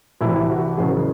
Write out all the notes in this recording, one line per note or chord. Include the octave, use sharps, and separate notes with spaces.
C2 C3 E3 E4
F#4
F#1 E2 C#3 F#3 G#4